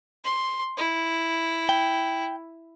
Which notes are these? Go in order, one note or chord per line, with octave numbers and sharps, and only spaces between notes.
C6
E4
G5